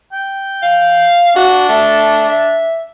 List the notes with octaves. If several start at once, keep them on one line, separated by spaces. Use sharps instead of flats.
G5
F5
D4 F#4
A3
E5